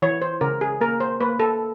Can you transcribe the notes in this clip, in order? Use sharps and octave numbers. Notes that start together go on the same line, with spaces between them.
E3 C#5
C5
C#3 A#4
G#4
A#3 A#4
C5
A#3 B4
A4